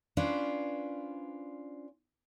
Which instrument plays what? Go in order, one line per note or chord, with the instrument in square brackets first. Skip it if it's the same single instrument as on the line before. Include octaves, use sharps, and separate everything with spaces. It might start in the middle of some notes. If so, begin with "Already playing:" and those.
[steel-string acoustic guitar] C#4 D4 F4 B4 C5